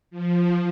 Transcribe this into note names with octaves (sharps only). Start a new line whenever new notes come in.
F3